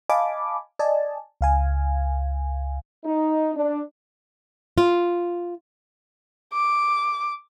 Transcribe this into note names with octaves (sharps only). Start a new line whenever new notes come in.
D#5 F5 G#5 A5 B5 D6
D5 D#5 G#5 A5
C#2 F5 G#5
D#4
D4
F4
D6